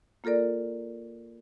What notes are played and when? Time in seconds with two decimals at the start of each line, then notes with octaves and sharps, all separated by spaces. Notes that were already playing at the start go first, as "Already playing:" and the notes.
0.24 A#3 F4 A4 A#4 D5